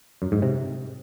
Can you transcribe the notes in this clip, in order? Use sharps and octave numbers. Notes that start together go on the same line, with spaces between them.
F#2
G#2
C3